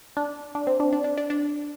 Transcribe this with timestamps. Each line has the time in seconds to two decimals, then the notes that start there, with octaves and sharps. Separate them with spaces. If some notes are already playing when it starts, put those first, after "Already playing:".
0.17 D4
0.55 D4
0.67 C4
0.80 D4
0.93 D4
1.04 D4
1.17 D4
1.30 D4